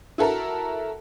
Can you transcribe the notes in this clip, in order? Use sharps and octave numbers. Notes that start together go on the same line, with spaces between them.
E4 F#4 A4 A#4